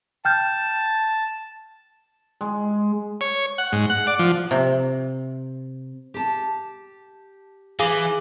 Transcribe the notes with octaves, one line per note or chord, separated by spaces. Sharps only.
G5 A5 F6 G6
G#3
C#5
F#5
G#2
F#5
D5
F3
C3
G4 A5
E3 G#4 F5 D6